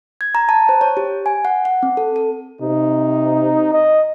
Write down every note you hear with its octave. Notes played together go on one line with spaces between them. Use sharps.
G#6
A#5
A5
C5
C#5
G4
G#5
F#5
F#5
C4
A4
A4
C3 D#4
D#5